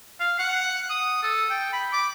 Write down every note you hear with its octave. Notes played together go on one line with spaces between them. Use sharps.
F5
F#5
D#6
A4
G5
B5
D6